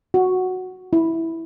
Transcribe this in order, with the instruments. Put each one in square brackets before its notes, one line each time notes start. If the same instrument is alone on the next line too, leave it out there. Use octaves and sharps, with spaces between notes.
[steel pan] F#4
E4